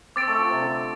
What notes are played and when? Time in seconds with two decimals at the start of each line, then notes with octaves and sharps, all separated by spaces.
0.16 C4 D6 A6 D7
0.28 A3
0.38 F3
0.50 C3
0.61 D3